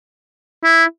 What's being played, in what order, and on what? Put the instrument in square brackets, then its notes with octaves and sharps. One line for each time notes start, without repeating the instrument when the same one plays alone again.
[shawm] E4